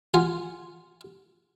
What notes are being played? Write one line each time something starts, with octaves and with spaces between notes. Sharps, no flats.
F4 F#5 G#5